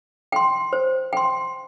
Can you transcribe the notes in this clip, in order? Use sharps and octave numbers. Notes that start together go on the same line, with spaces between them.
G5 C6
C5
G5 C6